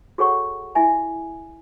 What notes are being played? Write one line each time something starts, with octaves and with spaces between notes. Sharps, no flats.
F#4 G#4 A4 C#5 F#5 C#6
E4 E5 G#5